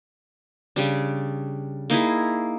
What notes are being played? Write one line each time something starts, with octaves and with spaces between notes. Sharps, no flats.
C#3 G3 D4
A#3 D#4 E4 G#4